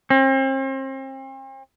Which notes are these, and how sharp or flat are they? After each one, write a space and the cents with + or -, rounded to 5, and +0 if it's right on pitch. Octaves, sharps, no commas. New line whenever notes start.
C4 +40